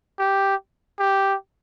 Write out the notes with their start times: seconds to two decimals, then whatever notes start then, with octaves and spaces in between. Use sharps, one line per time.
0.19 G4
0.99 G4